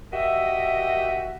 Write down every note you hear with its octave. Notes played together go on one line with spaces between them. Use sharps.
F#4 G4 A#4 D#5 E5